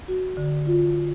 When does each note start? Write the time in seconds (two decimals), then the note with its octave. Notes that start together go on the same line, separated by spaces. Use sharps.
0.08 F#4
0.37 D3
0.67 F4